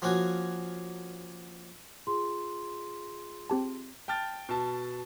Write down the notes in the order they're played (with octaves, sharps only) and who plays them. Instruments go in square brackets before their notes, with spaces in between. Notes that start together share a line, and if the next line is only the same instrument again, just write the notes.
[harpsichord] F3 A#3 C#4 F#4 G#5
[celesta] F4 G#4 C6
[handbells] C4 G4 A5
[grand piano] G5 A5 F6 A6
B2 A5